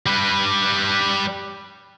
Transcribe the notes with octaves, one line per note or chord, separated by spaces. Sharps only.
G3 B4